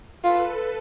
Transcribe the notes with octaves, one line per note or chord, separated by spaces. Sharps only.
F4 A4 B4